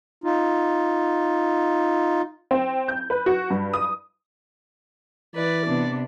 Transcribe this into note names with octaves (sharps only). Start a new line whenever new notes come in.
D#4 F4
C4
G6
B4
F#4
G2
D#6
E3 B4 D5
C3 B3 D4